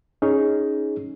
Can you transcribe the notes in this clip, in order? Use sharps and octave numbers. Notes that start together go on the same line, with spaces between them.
C#4 D#4 G#4